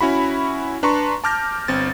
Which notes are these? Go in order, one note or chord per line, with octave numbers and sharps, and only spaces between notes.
C#4 E4 F#4 B5
D4 B4 A5 A#5 C6 C#6
A5 D6 F6 G6 A#6
G1 C4 A6